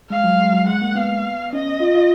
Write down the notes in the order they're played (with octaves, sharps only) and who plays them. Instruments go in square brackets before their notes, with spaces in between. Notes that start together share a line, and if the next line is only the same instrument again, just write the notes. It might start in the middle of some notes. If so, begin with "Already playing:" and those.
[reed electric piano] G#3 [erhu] F5
[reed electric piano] F#3
G#3
F#3
[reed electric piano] G#3 [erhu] F#5
[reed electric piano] A#3
[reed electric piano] B3 [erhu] F5
[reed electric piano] C#4 [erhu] D#5
[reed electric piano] F4
F4